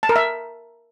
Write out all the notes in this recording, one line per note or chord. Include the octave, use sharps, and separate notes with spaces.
A5
A#4
E5